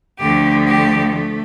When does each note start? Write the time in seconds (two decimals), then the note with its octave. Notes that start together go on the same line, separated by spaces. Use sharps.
0.19 D2 D3 F3 A3 G4
0.67 G4
1.15 A3